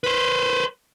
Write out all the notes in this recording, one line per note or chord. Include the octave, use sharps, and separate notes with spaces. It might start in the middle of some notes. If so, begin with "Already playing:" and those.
B4 C5